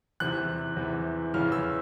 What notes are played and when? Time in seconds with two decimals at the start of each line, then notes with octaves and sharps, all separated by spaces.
0.20 E2 C3 E3 F#6
0.76 E2 C3 E3
1.34 E2 C#3 E3 F6
1.52 E6